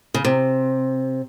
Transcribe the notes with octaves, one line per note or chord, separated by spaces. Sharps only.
C#3
C3